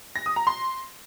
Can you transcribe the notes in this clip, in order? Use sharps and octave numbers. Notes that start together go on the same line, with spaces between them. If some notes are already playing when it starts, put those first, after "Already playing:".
A#6
D#6
A#5
C6